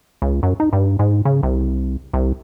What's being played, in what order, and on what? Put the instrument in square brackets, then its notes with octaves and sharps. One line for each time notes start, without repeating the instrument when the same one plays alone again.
[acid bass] C#2
F#2
D#4
G2
G#2
C#3
C2
C2